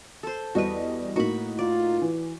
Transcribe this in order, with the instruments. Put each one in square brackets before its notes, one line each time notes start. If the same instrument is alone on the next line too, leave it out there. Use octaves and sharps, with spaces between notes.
[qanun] A4 C5
[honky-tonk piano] E2 G3 D#5 [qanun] F#4 B4
[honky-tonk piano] A2 A#3 D#4 [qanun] F#4 B5
[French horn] F4 [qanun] D5
[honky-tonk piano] E3